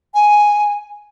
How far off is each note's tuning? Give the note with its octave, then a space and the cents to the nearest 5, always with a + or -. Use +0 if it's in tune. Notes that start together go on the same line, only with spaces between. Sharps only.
G#5 +0